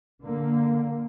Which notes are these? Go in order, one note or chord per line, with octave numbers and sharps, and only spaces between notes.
D3 A#3